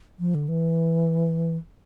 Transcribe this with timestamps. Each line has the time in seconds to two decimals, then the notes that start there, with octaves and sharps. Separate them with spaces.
0.19 F3
0.35 D3
0.49 E3